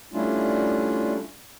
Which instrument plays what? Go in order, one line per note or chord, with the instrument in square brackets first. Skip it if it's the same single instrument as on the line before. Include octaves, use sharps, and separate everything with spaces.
[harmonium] G3 A3 C#4 D4 E4 F4